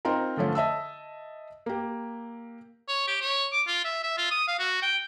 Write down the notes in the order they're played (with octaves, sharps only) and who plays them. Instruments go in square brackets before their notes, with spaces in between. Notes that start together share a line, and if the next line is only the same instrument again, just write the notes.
[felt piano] C4 D#4 F4 A#4
D3 F3 A3 C#4 F4
D#5 E5 A5 E6
A#3 G4
[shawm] C#5
G4
C#5
D6
F4
E5
E5
F4
D#6
F5
F#4
G5